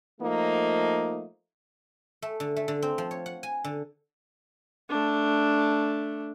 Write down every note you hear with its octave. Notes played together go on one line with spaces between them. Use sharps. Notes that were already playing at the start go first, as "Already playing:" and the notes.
F3 A3 A#3 D#4
A3
D3
A3
D3
C4
F3
C#5
F#5
G#5
D3
A3 D4